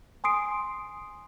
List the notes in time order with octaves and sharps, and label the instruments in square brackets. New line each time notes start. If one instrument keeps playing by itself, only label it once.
[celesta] G#5 C6 D#6 C7 D7